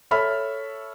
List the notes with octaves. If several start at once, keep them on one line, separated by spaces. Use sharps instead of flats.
A4 C#5 E5 B5 F6